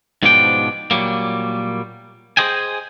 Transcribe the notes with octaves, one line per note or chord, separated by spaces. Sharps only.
G#2 B2 F3 D4 E4 G5
A#2 F#3 G3 A#3
G#4 C5 D#5 G5 G#5